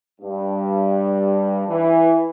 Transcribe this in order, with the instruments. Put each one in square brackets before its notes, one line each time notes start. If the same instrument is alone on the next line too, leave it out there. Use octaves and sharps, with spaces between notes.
[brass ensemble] G2
E3